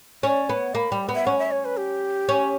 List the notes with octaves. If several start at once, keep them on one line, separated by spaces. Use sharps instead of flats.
C#4 D5
B3 C#5
A#3 B5
G3
B3
E5
C#4 F#5
E5
C#5
B4
G4
C#4